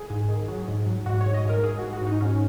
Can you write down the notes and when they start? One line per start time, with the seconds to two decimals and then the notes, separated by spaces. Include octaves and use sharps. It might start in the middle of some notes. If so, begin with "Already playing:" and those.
Already playing: G#4
0.10 G#2
0.28 D#3
0.48 F#3
0.68 G#2
0.86 F#3
1.06 G#2 F#4
1.21 C#5
1.26 G#2
1.34 D#5
1.45 G#2 A#4
1.63 G#2 G#4
1.79 G#2 F#4
1.93 F#4
2.02 G#2 D#4
2.21 G#2 C#4